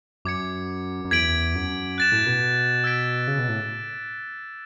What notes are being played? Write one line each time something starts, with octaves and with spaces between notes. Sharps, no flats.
F#2 D6 G#6 C#7
F#2
E2 G#6 B6 D7 F#7
F#2
F#6 A6 E7
A2
B2
E6 G#6 B6 D7
C#3
B2
A2